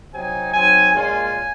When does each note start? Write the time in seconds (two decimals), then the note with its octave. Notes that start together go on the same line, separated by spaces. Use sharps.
0.13 C3 F#3 C4 D#4 G#5
0.52 F#3 C4 D#4 G#5
0.93 A#2 G#3 C#4 F4 G#5